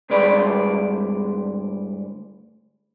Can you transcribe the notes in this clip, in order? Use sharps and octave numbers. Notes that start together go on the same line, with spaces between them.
D2 G2 G#3 B4 D5